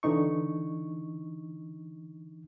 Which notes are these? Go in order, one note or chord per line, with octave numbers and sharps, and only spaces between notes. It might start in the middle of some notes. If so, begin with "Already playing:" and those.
D3 E3 D#4 C#6